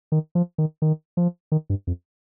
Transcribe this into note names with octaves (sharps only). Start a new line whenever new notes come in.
D#3
F3
D#3
D#3
F3
D#3
G2
F2